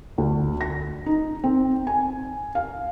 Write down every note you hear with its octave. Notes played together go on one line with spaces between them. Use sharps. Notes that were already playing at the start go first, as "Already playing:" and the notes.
D2
A#6
D#4
C4
G#5
F5